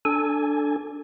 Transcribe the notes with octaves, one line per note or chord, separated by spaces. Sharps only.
D4 A4 G#5